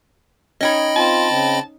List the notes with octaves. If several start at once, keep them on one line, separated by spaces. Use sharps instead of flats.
C#4 D#4 C#5 D#5 G5 B5
C4 F4 A5
C#3 C4